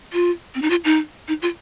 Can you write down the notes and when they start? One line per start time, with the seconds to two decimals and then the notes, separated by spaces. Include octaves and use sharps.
0.13 F4
0.55 C4
0.62 D#4
0.70 F4
0.85 D#4
1.28 D#4
1.42 F4